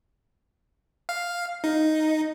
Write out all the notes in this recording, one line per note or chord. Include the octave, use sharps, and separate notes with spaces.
F5
D#4